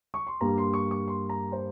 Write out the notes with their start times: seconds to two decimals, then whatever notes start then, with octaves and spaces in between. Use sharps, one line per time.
0.14 C#6
0.27 C6
0.41 G2 G3 A#3 A#5
0.58 C6
0.73 C#6
0.91 C#6
1.08 C6
1.29 A#5
1.52 C5